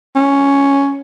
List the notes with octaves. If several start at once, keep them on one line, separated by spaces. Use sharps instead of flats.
C#4